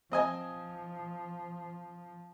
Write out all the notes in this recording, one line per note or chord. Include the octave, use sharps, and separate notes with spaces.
F3 C4 D#5 G#5